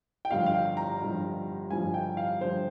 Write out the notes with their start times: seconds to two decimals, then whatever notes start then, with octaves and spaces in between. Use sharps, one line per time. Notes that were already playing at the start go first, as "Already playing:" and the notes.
0.25 G5
0.31 G1 G2 F3 F5
0.46 F5
0.54 G5
0.77 A#5
1.01 G1 G2 F3
1.70 G1 G2 F3 G#5
1.94 G5
2.17 F5
2.40 G1 G2 F3 C5